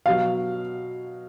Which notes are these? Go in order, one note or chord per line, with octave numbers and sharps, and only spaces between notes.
B2 F#3 F5